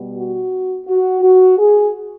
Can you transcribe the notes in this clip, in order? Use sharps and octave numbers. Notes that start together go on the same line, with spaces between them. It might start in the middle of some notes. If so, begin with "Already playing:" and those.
Already playing: B2 G3 B3
F#4
F#4
F#4
G#4